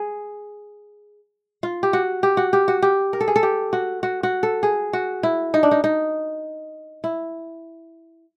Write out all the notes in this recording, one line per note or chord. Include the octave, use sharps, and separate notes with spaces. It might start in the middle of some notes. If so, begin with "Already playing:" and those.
Already playing: G#4
F4
G4
F#4
G4
F#4
G4
F#4
G4
A#4
A4
G#4
A4
G4
F#4
F#4
F#4
A4
G#4
F#4
E4
D#4
D4
D#4
D#4
E4